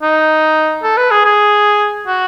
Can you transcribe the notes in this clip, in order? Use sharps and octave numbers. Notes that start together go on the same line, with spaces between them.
D#4
A4
B4
G#4
G#4
F#4